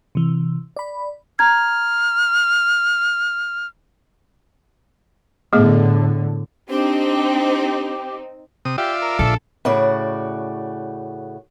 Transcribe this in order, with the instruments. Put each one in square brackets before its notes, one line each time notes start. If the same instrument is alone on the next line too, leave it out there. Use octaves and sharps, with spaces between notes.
[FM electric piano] C3 E3
D5 B5
[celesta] A#5 G#6 [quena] F6
[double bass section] A2 D3 [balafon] A3 B3 G#4
[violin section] C4 D#4 [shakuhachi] D4 [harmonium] G4
[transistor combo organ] C3 D#6
[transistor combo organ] F4 D5 E5 [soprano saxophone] G4
[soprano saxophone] A#4
[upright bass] A#1 [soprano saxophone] A4
[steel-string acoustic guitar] A2 C#3 F#4 D5